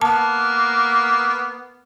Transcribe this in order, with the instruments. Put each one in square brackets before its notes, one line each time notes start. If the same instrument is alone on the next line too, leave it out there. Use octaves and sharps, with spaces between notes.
[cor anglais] A#3 [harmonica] B3 [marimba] A5